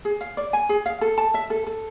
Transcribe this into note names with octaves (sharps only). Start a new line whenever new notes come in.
G#4
F5
D5
G#5
G#4
F5
A4
A5
E5
A4
A4